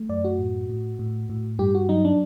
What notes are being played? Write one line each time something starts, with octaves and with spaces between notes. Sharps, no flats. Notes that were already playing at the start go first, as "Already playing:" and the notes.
Already playing: A3
F#2 D5
F#4
A2
A2
A2
A2
G2 G4
F#4
F#3 D#4
D4